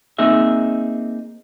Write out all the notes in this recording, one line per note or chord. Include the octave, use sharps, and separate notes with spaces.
A#3 C4 D#4 G#4 E5